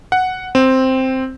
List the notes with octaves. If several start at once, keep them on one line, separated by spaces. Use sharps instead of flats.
F#5
C4